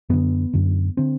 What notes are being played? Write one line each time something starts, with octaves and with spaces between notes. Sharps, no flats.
F#2 D3 B3
F#2 D3
D3 C4